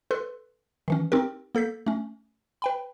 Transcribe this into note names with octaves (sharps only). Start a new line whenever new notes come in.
A4 B4 C6 F#6
D#3 E3 C#4
C4 D#4 G4 A#4
A#3 A4 G6 B6
A3 C#4
B4 G5 B5